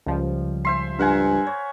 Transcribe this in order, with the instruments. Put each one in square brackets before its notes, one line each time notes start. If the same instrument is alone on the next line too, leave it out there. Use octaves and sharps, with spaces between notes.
[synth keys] C#2 F3 G3
[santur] C5 E5 C6
[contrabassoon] G2 [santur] A#4 F#5 G#5
[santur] C#5